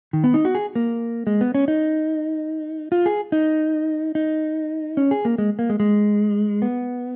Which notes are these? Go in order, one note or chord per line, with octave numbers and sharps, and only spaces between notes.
D#3
B3
D#4
F#4
G#4
A#3
G#3
B3
C#4
D#4
F4
G#4
D#4
D#4
C#4
G#4
A#3
G#3
A#3
G#3
G#3
B3